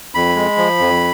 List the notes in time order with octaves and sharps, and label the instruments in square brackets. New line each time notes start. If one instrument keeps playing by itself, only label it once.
[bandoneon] F2 B5
G#3
F3
F2